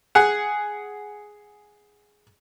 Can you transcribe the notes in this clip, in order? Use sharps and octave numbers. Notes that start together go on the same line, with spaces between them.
G#4 F#5